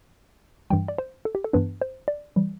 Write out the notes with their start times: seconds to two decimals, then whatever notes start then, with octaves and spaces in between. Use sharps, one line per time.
0.70 G2 E3 G3 G5
0.88 D5
0.98 C5
1.25 A4
1.35 G4
1.44 A4
1.53 G2 E3 B3 D4 B4
1.81 C5
2.08 D5
2.36 E3 G3